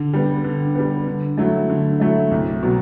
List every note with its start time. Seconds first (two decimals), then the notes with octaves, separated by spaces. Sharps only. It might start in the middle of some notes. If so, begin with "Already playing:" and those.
Already playing: D3
0.13 G3 B3
0.44 D3
0.75 G3 B3
1.07 D3
1.38 F#3 A3 E4
1.70 D3
2.00 F#3 A3 E4
2.31 C2
2.63 B2 F#3